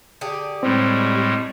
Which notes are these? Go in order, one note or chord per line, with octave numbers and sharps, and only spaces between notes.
D3 G4 G#4
A2 G3 G#3 C4